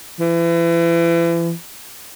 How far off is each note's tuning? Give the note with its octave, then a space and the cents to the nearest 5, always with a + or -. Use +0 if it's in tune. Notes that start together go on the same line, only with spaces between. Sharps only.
E3 +35